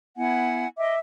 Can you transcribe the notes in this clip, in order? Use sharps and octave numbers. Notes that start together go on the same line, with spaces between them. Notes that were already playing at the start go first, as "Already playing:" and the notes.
B3 E4 F#5 G#5
D#5 E5 D6